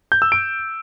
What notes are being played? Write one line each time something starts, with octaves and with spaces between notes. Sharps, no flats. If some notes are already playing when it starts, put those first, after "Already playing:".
G6
E6
D7